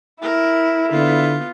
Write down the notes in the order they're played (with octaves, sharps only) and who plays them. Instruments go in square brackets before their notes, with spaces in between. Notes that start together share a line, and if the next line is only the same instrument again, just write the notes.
[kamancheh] E4 [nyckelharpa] A#4
[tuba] D3 [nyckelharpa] B3 F4